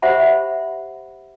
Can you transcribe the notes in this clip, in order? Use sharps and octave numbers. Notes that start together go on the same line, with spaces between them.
G4 C5 E5 F#5 B5